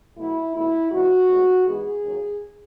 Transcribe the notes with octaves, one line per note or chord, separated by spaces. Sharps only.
B2 F#3 A3 E4
E2 B2 A3 E4
C#3 E3 G#3 F#4
A2 G#3 B3
G#2 E3 G#3 B3 G#4
D#2 C#3 F#3